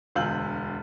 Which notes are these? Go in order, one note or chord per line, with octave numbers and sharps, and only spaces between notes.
E1 D2 F5 E6 G6 F#7